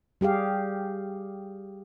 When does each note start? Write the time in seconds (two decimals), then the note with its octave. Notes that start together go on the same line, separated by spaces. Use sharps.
0.21 G3 G4 G#4 F5